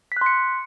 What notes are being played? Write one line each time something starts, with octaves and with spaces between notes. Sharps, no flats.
C6 F#6 B6 C#7